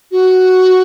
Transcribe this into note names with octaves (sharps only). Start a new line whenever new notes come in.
F#4